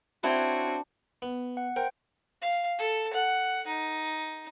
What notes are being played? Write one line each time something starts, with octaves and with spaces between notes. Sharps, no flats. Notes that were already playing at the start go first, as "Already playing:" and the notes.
C4 D4 E4 F#4 C#5
B3
F#5
A#4 C5 G5
F5
A4
F#5
D#4